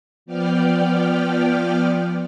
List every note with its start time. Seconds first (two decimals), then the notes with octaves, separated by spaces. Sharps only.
0.26 F3 B3 D5 G5 F6